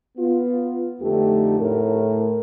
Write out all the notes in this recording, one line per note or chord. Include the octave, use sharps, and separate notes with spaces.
B3 F4
F2 D3 A3 D#4 G4
A2 A#4